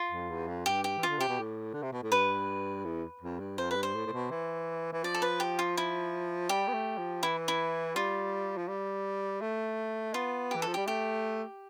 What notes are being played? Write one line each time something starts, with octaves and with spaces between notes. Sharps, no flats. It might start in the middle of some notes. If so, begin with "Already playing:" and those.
Already playing: F4
F2
E2
F2
G2 G4
G4
E3
D3 F4
C3 G4
B2
A2
D3
C3
B2
A2
G2 B4
E2
F2
G2
F2 C5
B4
G2
C5
A2
A2
B2
E3
E3
F3 D5
A4
B4
G4
F4
E4
G3 G4
B3
A3
F3
E3 E4
E4
G3 F4
F3
G3
A3
B3 F4
G4
E3
A4
F3
G3 G4
A3 G4